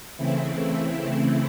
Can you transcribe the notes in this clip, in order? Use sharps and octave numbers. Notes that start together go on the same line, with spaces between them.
C#3 E3 A3 C4 E4